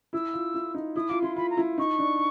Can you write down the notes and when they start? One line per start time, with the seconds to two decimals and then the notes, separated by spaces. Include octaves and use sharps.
0.13 E4 E6
0.34 F4
0.54 E4
0.74 D#4
0.96 E4 D#6
1.09 F4 D6
1.22 E4 C6
1.36 F4 B5
1.50 A#5
1.57 E4
1.78 D#4 C#6
1.98 D4